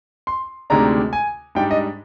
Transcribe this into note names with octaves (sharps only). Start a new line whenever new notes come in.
C6
D2 C3 D#3 G#3 D4 A#5
G#5
G#2 G3 D4 G5
D#5